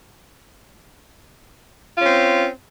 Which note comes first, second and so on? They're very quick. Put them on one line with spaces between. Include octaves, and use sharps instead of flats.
F4 C#4 C4